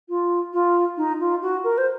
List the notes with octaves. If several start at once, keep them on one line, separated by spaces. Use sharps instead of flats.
F4
F4
D#4
F4
F#4
A#4
C5